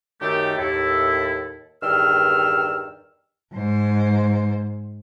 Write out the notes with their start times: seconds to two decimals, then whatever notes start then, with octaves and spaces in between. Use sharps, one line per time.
0.21 F#2 D#3 A3 G4
0.58 D#2 A2 E4 A4
1.82 E2 G2 D#3 G5 E6 F6
3.53 G#2 C5